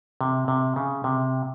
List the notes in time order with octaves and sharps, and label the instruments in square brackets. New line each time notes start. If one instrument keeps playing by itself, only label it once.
[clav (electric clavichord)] C3
C3
C#3
C3